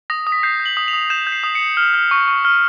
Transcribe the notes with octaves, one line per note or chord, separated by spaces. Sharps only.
D#6 A#6
D#6
B6
G6 C7
G6
F#7
D#6
F7
D#6
G6 E7
G6
C7
D#6
C#7
D#6
F6
F6
C#6
C#6
F6